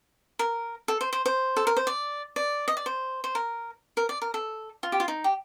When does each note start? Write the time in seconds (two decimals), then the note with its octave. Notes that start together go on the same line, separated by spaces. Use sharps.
0.39 A#4
0.88 A4
1.01 C5
1.13 C5
1.26 C5
1.57 A4
1.67 A#4
1.77 C5
1.87 D5
2.36 D5
2.68 D#5
2.77 D5
2.86 C5
3.24 C5
3.35 A#4
3.97 A#4
4.09 D5
4.22 A#4
4.34 A4
4.83 F4
4.92 G4
5.00 F4
5.08 D#4
5.24 G4